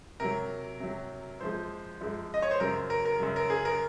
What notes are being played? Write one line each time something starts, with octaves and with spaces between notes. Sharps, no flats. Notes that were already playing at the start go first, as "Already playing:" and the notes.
C3 F#3 A#4
C3 F#3
F#2 F3 G#3 C5
F#2 F3 G#3
D#5
C#5
C5
F#2 C#3 F#3 A#4
A#4
A#4
F#2 C#3 F#3
A#4
G#4
A#4